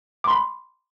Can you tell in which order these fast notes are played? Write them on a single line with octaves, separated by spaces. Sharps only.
D6 C6 B5